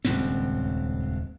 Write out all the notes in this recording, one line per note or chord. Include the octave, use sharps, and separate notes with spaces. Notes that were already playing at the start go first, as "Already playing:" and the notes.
D#1 C#2 G2 C4